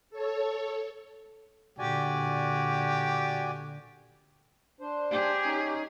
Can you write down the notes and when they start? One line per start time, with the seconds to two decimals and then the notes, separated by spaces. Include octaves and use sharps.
0.10 A4 C#5
1.79 A#2 D3 F#4 G4 D5 G#5
4.81 D4 C5
5.11 G4 G#4
5.45 C#4 D#4